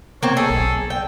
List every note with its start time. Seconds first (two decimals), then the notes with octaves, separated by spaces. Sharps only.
0.23 A#3 C4 C#5
0.37 G#4 A4
0.50 B1
0.90 G5